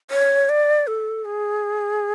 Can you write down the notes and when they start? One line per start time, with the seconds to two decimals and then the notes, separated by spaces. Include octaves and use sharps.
0.11 C#5
0.49 D5
0.87 A4
1.25 G#4